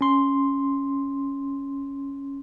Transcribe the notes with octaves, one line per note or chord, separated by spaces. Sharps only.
C#4 C6